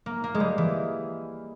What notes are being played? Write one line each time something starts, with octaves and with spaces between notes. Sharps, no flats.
A#3
A#3
G#3
G3
E3